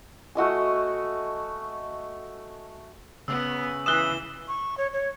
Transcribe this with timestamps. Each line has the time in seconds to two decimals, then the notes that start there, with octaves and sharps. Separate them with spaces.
0.35 A3 F#4 D#5 G#5
3.28 C#3 B3 E6
3.86 E3 D#6 E6 F#6 E7 G7
4.48 C#6
4.78 C#5
4.93 C#5